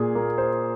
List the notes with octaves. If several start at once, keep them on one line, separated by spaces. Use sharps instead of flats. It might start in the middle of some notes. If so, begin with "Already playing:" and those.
Already playing: A#2 G#4
A#3
C5